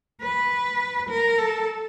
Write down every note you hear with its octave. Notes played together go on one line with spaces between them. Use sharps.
B4
A#4
A4